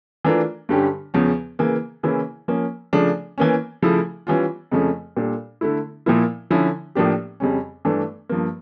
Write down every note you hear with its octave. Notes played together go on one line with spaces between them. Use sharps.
E3 A3 D4 F4 A#4
G2 D3 G3 C#4 G4
E2 C#3 F3 C#4
C#3 E3 A#3
C#3 E3 A#3 C#4 E4
F3 A#3 C#4
C#3 F3 A3 D4
E3 A#3 C#4
C#3 F3 A3 E4
E3 G3 C#4 F4
F2 C#3 F3 A3 C#4
A#2 G3 D4 A4
D3 A3 E4
A#2 F3 A#3 E4
D3 F3 C#4 E4
A2 F3 A#3 D4 G4
F2 C#3 G3 C#4
G2 E3 A3 D4
G2 F3 A#3